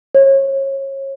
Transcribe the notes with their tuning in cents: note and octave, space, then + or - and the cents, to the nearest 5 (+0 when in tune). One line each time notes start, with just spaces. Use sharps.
C#5 -30